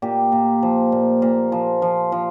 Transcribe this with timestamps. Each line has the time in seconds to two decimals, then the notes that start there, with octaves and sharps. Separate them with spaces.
0.02 A#2 G4
0.32 A#2
0.62 F3
0.92 A#2
1.22 A#2
1.52 F3
1.82 F3
2.12 F3